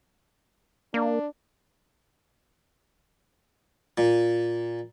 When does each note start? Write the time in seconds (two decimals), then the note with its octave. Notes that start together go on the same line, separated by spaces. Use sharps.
0.94 A#3 D4
3.98 A#2